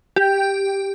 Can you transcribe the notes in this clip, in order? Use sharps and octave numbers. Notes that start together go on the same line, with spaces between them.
G4